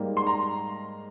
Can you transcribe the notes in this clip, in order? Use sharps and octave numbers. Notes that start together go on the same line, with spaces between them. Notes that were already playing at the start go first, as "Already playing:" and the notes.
Already playing: G#2 G3 A#3
C6
A#5